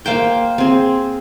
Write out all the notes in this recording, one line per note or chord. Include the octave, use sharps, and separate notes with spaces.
A#3 C5 G5 C6
C4 G#4